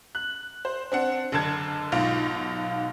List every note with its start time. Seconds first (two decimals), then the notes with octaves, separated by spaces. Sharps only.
0.15 F#6
0.65 C5
0.92 C4 D4 F#5
1.32 F#1 D3 A5 G#6
1.92 B1 G#2 F4